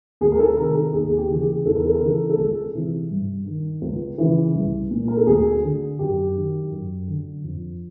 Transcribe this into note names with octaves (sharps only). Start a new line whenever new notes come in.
D2 G#4
A#4
A4
C3 D#3 A#4
A4
D#2 G#4
G#4
G4
C#3 E3
G#4
E2 A4
A#4
A4
A#4
C#3 E3 A4
A4
C#2 G#4
C3 E3
G2
D#3
C#2
C#3 E3
C2
A#2
A#4
A4
D2 G#4
D3
F#2 G4
D#3
F#2
D3
F2